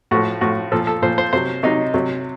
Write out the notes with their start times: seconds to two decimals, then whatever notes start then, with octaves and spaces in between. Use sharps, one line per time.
0.11 A2 F3 F#4
0.41 A2 F3 F#4
0.72 A#2 F3 A4
0.87 A4
1.02 A#2 F3 C5
1.18 C5
1.33 C3 F#3 C5
1.63 C3 F#3 D#4
1.94 C3 F#3